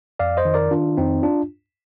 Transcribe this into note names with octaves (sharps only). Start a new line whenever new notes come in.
F2 D5 F5
C5 D#5
D#3
A#4 D5
D#3 D4 F4
F2 C4 D#4
D4 F4